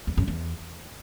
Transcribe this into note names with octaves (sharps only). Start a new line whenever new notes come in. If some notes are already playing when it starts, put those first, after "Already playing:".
E2
F#2
E2